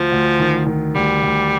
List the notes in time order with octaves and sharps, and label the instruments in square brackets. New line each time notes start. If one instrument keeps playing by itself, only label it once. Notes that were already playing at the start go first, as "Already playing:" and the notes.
Already playing: [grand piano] D2 [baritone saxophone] F3
[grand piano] D2
D#3
D#3
[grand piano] D2 [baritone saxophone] G3
[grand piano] D2